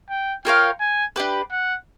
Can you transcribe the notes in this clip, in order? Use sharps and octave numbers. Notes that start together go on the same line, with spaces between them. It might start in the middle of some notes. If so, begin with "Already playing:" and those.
G5
F4 A#4 C#5 F5 G5
G#5
D4 G4 B4
F#5